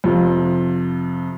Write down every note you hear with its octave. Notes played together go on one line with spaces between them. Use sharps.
F2 C3 F3